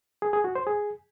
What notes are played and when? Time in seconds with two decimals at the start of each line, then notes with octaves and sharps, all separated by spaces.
0.22 G#4
0.33 G#4
0.44 F#4
0.55 C5
0.67 G#4